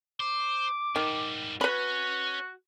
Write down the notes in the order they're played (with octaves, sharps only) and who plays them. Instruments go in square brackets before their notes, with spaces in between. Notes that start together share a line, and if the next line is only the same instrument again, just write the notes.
[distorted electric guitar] C5 [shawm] D6
[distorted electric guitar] G#2 G3 [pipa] D#3
[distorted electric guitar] C#4 [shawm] F#4 [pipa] B4 B5